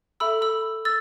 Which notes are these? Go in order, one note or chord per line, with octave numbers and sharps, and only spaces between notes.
A4 E5 B5 E6
B5 E6
E6 A6